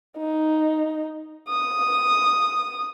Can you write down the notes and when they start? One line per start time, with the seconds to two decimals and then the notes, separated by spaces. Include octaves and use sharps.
0.18 D#4
1.49 D#6